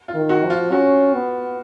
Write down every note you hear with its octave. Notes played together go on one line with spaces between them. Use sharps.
F4
D#3
F#4
F3
F4
C#4 F#4
B3